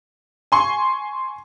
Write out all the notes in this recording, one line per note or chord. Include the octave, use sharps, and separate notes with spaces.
G#5 C6 C#6